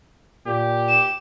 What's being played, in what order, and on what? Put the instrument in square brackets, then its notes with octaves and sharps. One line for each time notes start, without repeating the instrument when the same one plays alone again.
[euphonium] A#2 [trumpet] G4
[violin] E7